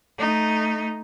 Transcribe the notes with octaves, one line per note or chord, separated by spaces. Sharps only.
A3 D#4